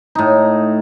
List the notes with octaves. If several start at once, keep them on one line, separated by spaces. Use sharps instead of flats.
A2 D#4